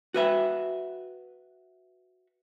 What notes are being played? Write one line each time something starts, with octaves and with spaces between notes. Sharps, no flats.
F#4 B4 E5